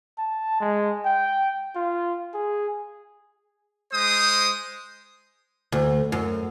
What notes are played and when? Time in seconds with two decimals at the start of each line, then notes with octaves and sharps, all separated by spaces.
0.18 A5
0.60 G#3
1.05 G5
1.75 F4
2.34 G#4
3.92 G#3 C5 D#6
5.72 D2
6.12 F#2